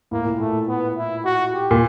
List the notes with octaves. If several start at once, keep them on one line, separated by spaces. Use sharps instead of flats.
A2 A#3
A#2
A2 A3
B3
E4
F#4
G4
A#2